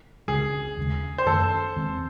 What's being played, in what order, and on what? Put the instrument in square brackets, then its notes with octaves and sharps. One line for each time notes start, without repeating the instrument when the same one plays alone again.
[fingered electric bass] C#2 C#3 G#3 [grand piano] G#4
[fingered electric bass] D#2 C#3 G#3
[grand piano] C5
[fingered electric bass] F#2 D#3 A3 C#4 [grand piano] A4
[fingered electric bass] E2 D#3 G#3 C4